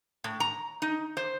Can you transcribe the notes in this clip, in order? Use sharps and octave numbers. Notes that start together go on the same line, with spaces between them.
A2
A#5
D#4
C5